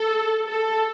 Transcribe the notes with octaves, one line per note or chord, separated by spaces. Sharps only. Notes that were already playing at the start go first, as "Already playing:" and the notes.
Already playing: A4
A4